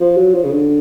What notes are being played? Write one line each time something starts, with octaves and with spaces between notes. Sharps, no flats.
F3
F#3
F3
C#3
D3